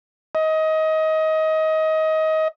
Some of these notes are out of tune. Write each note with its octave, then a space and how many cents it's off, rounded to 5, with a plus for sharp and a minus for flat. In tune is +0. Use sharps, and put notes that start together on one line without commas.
D#5 +25